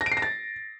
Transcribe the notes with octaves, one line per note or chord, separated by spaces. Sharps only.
A#6
D7
C7
A#6
A6